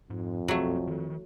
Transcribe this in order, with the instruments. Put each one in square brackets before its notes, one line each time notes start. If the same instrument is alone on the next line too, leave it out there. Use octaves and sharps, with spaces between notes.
[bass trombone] F2 [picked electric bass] G#2
[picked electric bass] F#1 B1 C4 [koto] F#3 A3
[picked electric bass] D#3 E3